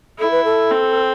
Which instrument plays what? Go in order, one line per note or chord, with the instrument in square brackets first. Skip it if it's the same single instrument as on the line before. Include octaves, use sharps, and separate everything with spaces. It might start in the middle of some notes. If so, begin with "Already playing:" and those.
[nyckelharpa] E4 [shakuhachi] A4
[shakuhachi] B4
A4
[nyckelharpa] C4